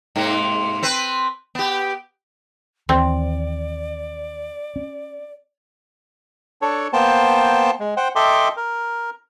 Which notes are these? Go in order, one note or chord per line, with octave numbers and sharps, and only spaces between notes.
G#2 C3 A#3
C4 B4
B3 G4
D#2 E3 C4 D5
C#4
D4 A4 C#5
A#3 B3 C5 G5 A5
G#3
C5 F#5 G5
A4 D#5 E5 G5 C6 D6
A#4